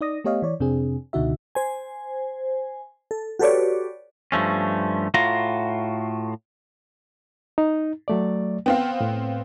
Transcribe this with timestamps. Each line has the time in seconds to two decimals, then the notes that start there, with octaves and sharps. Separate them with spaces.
0.01 D#4 D5 D#6 A#6
0.24 A3 B3 G4 C#5 D#5 F5
0.42 E3 C#5 D5
0.60 F2 C3 C4 D4 G#4
1.13 C#2 B2 D3 D#4 F#4 E5
1.55 C5 G#5
3.11 A4
3.39 F#4 G4 A4 B4 C#5 D5
4.32 G2 F3 A3 C#4
5.14 A2 F4 F#4 A#5
7.58 D#4
8.08 F#3 A3 D5
8.66 B3 C4 F5 G5
9.00 A2